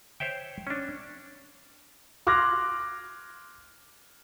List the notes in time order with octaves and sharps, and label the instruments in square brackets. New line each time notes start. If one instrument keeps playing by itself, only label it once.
[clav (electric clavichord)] C5 C#5 E5 G5
C#4 D4
[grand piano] C6 D6 F6 F#6 G#6 A#6